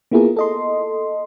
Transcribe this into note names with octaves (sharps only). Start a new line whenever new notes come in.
A#3 B3 E4 F4 G#4 A#4
A4 D#5 C6